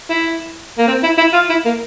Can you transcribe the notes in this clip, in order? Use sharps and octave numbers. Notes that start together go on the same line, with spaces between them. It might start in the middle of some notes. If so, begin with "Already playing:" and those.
E4
A#3
C4
E4
E4
F4
E4
A#3